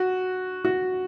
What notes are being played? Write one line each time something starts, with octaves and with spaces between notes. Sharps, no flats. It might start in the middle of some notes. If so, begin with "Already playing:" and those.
Already playing: F#4
F#4